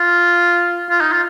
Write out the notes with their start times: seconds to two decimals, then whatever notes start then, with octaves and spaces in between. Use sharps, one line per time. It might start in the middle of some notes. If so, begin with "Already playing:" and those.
Already playing: F4
0.90 F4
1.01 D#4
1.12 F4